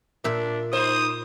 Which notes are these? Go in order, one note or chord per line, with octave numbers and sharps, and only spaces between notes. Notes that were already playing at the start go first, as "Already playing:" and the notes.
A#2 D4 E5
G#3 D#4 C5 D#6